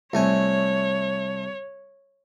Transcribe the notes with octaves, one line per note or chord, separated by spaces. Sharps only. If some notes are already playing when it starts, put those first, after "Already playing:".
C2 A3 C#5 G#5